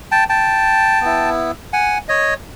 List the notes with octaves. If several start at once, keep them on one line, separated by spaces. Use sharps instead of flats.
G5 A5
G5 A5
B3 E4
F#5 G#5
C#5 D#5